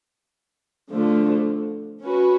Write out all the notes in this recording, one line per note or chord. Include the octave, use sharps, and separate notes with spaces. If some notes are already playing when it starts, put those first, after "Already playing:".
D3 F3 A3
C#4 F#4 B4